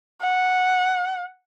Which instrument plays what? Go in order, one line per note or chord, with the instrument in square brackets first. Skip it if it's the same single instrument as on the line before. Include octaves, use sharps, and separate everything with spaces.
[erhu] F#5